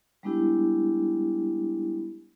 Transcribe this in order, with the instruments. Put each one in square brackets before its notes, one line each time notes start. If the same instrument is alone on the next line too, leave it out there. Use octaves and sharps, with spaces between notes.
[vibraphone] G3 G#3 B3 D4 E4 G4